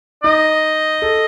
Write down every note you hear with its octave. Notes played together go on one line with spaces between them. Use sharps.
D#4 D#5
A4